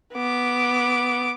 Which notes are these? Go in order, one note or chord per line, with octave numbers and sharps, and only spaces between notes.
B3 D6